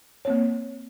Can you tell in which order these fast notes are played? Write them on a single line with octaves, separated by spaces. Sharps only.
C#5 C4 A#3